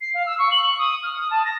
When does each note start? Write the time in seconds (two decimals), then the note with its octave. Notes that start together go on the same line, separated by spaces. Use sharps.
0.01 C7
0.14 F5
0.26 E6
0.39 C#6
0.51 F#7
0.64 C#6
0.78 D#6
1.03 F6
1.17 D#6
1.31 A5
1.45 A#6